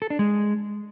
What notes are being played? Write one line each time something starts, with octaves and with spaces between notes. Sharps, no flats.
A4
D4
G#3